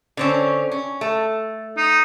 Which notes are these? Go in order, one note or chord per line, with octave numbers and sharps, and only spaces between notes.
D3 C4 C#4
C#4
A3
D#4